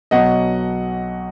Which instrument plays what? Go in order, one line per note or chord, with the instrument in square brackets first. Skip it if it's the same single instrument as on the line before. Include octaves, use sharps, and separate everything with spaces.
[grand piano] B1 B2 F#3 D#5 F#5